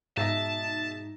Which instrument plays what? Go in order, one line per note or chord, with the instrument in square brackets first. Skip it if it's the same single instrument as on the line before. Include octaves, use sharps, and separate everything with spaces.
[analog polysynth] G#2 D#4 [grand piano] B2 E5 A#6 [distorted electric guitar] A5